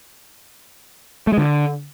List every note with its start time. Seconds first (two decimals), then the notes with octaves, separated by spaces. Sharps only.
1.27 A3
1.32 G#3
1.38 D3